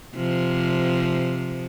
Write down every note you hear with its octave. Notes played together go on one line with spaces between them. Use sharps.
C3 F3